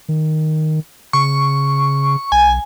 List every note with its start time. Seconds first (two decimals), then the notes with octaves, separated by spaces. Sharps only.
0.09 D#3
1.13 C#3 C#6
2.32 B1 G#5